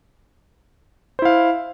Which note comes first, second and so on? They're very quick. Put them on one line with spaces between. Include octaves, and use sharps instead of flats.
C5 E4 F5